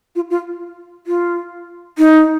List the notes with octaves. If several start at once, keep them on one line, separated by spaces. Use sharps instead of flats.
F4
F4
F4
D#4